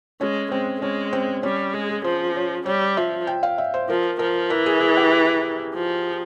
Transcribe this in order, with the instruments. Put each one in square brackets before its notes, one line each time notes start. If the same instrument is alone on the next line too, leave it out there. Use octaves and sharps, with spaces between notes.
[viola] G#3 [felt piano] C#4
[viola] G#3 [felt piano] C4
[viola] G#3 [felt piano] C#4
[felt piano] C4
[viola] G3 [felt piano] C#4
[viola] G#3 [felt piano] G#4
[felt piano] G#4
[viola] F3 [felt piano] C5
[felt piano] C#5
[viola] G3 [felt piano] C#5
[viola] F3 [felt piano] E5
[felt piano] G5
F5
E5
C5
[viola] F3 [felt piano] A#4
[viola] F3 [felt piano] A#4
[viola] E3 [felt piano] A#4
[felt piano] G#4
G#4
G4
[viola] F3